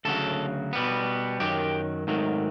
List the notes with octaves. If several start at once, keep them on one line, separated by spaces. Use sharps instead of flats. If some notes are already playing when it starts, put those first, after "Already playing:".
D2 C#3 F#3 A4
B2 G3 B3
F#2 D#3 F#3 G4
G#2 D#3 F#3 A3